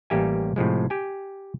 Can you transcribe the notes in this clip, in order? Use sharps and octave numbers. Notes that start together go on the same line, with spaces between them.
A1 G3 A#3 G4 E5 G#5
A2 C3 F3 G#3
G4 G5 G#5